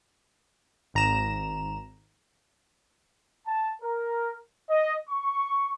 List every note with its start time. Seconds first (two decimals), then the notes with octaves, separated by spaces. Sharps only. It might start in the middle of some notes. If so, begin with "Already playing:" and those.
0.94 G#1 A#5 E7
3.47 A5
3.83 A#4
4.70 D#5
5.09 C#6